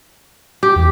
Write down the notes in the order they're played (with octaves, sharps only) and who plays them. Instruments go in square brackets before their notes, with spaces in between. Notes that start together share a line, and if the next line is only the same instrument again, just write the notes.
[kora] G4
[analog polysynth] E2